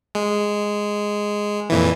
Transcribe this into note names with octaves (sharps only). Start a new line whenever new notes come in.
G#3
F2 A#2 E3